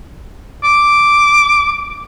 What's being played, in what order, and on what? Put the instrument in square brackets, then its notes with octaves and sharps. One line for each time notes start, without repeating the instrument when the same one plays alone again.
[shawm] D6